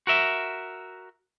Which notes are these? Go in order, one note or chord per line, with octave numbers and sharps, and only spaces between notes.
F#4 A#4 E5